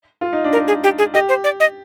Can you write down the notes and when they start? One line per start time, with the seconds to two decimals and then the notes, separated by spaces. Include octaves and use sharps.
0.21 F4
0.33 D#4
0.44 D4
0.53 A#4
0.55 D#4
0.68 G#4
0.84 G4
0.98 G#4
1.14 G4 D#5
1.29 C5
1.44 D5
1.60 D#5